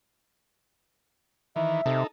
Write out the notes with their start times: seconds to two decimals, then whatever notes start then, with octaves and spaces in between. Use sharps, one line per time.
1.56 D#3 E3 E5
1.86 C3 D#4 A4